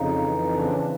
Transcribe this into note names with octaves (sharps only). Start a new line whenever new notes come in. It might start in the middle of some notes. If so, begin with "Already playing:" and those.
Already playing: F2 C#3 D#4
E3
C#3 D4
C4
C#4
D4